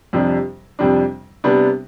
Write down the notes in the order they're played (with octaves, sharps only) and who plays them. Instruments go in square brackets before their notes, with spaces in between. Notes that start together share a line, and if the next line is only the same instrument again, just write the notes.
[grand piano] F2 C3 G3 D4
F2 C3 G3 D4
C3 G3 B3 D4